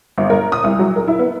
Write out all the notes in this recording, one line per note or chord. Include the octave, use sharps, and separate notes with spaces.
G1
A#4
D#6
C2
F#3
A#4
E4
B3